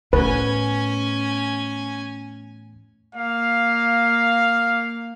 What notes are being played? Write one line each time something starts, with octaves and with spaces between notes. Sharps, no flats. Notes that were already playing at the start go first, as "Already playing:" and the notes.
E2 A2 C#4 B4 G#5
A#3 F5